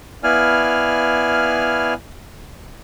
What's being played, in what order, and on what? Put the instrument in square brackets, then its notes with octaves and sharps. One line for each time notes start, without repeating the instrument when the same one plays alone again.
[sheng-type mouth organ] B3 E4 D5 F5 G#5 F6